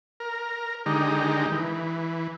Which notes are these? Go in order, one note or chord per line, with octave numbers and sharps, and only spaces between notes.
A#4
D3 D#3 G#3 D#4 G4
E3